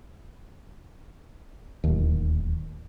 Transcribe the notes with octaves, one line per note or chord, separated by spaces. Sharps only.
D1 D#2